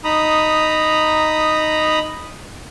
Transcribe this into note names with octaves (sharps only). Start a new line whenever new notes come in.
D#4 A#5 B5 D#6